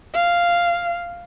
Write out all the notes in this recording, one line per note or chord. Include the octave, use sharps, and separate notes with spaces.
F5